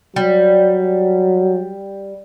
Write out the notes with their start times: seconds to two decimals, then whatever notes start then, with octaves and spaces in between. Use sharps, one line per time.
0.16 F#3 G3